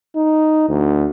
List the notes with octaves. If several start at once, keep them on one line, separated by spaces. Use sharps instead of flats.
D#4
D2